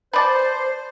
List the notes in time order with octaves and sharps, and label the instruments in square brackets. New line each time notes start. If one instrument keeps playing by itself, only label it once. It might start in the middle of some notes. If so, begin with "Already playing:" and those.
[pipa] B4 D5 A5 [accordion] C5